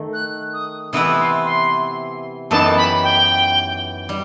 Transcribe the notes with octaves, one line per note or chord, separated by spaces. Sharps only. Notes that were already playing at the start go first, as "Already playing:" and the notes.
Already playing: D#3 A3
F#6
D#6
C3 E3 B3 E4 B4 D#6
C6
C6
F#2 E3 B3 D#4 G4 A5
B5
G5
G3